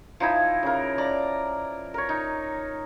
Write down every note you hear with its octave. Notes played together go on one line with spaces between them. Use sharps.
F3 D#4 E4
C#3 A#4
D5 A#5
A#4 C#5
D#4